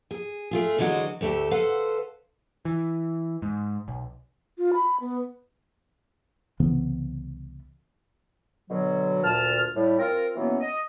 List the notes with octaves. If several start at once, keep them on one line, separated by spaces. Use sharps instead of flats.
G#4
A3 F4 G#4
D3 E3 F#3 G#3 F#4
D2 A3 G4 E5
A4 B4 C5 F5 F#5
E3
G#2
B1
F4
B5
B3
C2 C#3 E3 B3
B2 D3 F#3
D2 A#2 A5 F6
A2 G3
C4 F4 A#4
B2 E3 F#3 A#3 B3 C#4
D#5